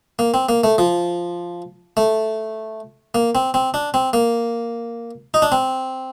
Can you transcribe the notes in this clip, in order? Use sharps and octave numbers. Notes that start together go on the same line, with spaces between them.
A#3
C4
A#3
A3
F3
A3
A#3
C4
C4
D4
C4
A#3
D#4
D4
C4